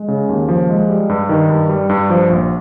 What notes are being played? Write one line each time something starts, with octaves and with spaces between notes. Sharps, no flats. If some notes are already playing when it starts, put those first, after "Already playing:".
Already playing: G#3
C#3
D#2
F3
G#3
G3
G2
D#3
G2
G3
G2
F3
A#1